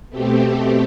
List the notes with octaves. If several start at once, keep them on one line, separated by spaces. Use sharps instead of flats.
B2 A3 C4 G4